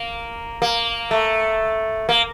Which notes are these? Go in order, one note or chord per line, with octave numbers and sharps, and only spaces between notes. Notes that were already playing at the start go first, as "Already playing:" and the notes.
Already playing: A#3
A#3
A3
A#3